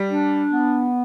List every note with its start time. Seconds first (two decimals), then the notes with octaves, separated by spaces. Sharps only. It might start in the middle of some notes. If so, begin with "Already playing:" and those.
Already playing: G3
0.10 D4
0.51 B3